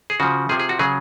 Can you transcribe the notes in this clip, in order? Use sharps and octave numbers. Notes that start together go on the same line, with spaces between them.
G#4
C#3 F3 F#4
C3 F3 G#4
G#4
F#4
C#3 F#3 G#4